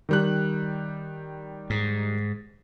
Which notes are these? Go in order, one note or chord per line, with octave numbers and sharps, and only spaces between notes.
D#3 G3 F#6
G#2